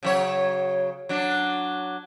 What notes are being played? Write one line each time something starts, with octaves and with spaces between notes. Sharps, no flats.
C#3 F#3 C#5
F#3 D4